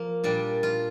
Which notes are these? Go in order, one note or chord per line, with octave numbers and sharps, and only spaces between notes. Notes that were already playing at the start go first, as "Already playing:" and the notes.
Already playing: F3 A#3
A#2 G3 D4
F4